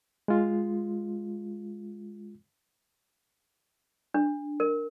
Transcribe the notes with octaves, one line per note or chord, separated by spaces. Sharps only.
G#3 F4
D4
A#4